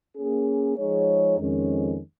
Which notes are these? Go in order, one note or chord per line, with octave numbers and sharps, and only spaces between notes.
A#3 C#4 G#4
F3 G#3 D#4 G#4 C#5
F2 D#3 G#3 C#4